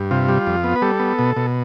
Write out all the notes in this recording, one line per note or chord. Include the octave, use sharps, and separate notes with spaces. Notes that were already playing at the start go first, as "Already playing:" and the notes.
Already playing: G2
C3 F4
G3
F2
B3
B4
G3 A4
B3
B2
B2